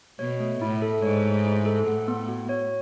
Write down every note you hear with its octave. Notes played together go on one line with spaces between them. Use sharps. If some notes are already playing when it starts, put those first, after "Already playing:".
B2 C#5
A3
A2 E4
A4
G#2 C#5
A3
E4
A4
A2 F#5
B3
F#4
C#5